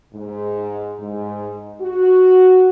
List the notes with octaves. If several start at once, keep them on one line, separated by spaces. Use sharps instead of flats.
G#2
G#2
F#4